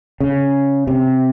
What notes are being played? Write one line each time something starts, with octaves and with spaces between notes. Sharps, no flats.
C#3
C3